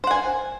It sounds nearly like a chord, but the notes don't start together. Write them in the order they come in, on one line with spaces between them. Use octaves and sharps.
C5 F#5 G#5